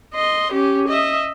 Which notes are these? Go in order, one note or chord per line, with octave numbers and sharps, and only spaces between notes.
D#5 C6
C#4 G4
D#5 E5